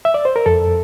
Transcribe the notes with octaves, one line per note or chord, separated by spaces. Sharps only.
E5
D5
C5
A#4
F2 A4